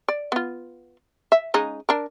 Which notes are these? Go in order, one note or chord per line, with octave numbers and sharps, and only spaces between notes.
D5
B3 F4
E5
C#3 G#3 D#4
D4 A#4